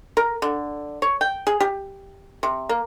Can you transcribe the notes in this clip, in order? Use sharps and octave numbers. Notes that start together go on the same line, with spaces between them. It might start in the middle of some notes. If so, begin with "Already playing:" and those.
A#4
D3
C#5
G5
G#4
G4
C3
A#3